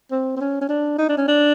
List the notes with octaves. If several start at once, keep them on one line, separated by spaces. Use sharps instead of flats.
C4
C4
C#4
C#4
D4
D#4
D4
C#4
D4